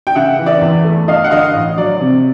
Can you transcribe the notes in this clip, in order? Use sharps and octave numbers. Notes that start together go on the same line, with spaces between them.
G5
C#3 E5 F#5
E3
D5 E5
E2
A3
G2 D#5 F5
F#5
D3 D#5 F5
A1
F#3 D5
C3